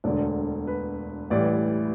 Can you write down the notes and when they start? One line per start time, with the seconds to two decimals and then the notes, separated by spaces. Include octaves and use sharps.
0.04 E1 D2 D3 D5
0.67 B4
1.30 A1 A2 E3 G3 D5